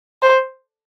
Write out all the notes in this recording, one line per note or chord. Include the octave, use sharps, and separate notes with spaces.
C5